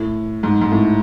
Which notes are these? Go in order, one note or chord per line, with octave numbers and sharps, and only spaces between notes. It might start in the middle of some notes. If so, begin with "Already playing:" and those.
Already playing: A2
G#2
G#2
A2